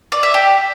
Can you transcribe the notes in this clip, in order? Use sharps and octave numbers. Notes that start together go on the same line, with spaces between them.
D5
E5
G4